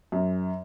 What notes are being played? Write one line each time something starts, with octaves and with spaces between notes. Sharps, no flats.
F#2